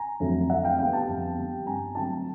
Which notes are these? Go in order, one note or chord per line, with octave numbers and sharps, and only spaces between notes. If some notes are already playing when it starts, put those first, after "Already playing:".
Already playing: G#5 A#5
F2 D3 F#3 A3
F2 E5 F#5
F5 G5
D3 G3 B3 F5 G5
G5 A5
F2
D3 G3 B3
G2 G#5 A#5
D3 F#3 A3 C4 G5 A5